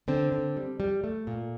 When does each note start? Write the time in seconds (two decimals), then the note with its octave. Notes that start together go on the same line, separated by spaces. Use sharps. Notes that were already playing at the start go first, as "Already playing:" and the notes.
0.08 D3 C4
0.32 D3
0.56 G3
0.80 G3
1.04 A3
1.27 A#2